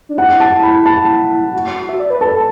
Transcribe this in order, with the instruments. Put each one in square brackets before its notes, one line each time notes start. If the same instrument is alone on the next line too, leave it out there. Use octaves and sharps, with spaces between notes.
[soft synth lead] D4
[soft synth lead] E4 [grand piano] F#5
[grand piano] A5
B5
A5
[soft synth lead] F#4
E5
D5
B4
[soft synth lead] A4 [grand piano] A5